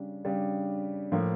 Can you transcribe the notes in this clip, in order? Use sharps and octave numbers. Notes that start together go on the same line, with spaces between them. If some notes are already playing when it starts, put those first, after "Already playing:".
Already playing: C#3 G3 D4
C#3 G3 D4
A2 F3 A#3